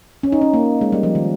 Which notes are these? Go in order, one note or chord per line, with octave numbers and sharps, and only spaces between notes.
C#4
D#4
C#4
A#3
G#3
G3
F3
D#3